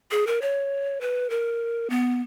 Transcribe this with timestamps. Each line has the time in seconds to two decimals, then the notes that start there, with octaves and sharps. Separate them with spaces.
0.11 G#4
0.27 A#4
0.42 C#5
1.01 B4
1.30 A#4
1.90 B3